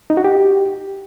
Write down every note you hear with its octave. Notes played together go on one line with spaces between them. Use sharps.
D#4
F#4
G4